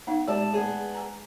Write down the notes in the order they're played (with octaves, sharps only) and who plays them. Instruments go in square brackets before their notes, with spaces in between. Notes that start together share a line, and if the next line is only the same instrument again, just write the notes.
[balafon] B3 D#4 F5
[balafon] G#3 G4 [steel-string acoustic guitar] D5 A5
[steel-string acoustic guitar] B3 G#4
[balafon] G#5 A#5